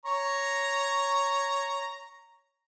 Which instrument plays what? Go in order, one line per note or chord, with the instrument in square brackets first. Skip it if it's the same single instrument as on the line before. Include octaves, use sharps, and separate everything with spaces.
[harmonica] C#5 A#5 C#6